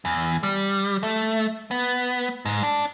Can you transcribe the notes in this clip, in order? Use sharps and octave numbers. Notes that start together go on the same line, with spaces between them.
E2
G3
A3
B3
G#2
D4